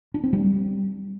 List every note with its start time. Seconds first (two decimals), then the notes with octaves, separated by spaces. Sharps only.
0.14 D4
0.24 C4
0.33 G3